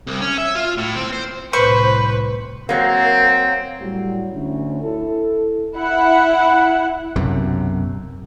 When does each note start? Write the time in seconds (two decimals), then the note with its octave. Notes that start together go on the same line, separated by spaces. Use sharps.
0.08 C2
0.21 C#4
0.38 E5
0.56 F4
0.78 A2
0.96 C4
1.13 C5
1.53 C2 A2 B4 C5 C#6
2.69 F#3 A#3 C4
3.80 A2 F#3 G3
4.33 D2 C#4
4.82 E4 A4
5.76 E4 F#5
7.16 B1 F#2 C3